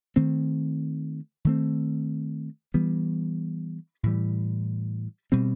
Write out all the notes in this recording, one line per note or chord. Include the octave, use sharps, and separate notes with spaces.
D#3 A3 C4
D#3 A3 C4
E3 G3 B3
A2 E3 G3
B2 G3 C4